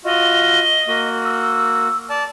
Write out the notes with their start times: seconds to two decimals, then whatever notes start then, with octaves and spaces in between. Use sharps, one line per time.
0.05 F4 F#4 D#5
0.88 A#3 F#4
1.24 E6
2.10 D5 A5